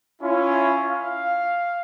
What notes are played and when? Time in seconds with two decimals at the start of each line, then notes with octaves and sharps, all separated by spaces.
0.22 C#4 E4 F4
0.87 F5